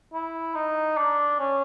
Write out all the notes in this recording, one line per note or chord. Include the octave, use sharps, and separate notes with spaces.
E4
D#4
D4
C#4